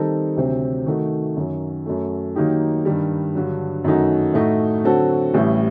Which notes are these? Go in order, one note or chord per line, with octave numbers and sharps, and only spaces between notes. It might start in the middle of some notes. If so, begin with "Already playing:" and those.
Already playing: D#3 G3 C4 D#4 A4
D2 C3 F#3 C4
D#3 A3 D#4 F#4
F#2 D#3 F#3
F#2 F#3 A3
D#3 F#3 A#3 D#4 G4
G2 D#3 G3
G2 D3 F#3
F#2 D#3 A3 D#4 F#4
A2 A3 D#4 F#4
D3 F#3 C4 F#4 A4
A1 A2 G3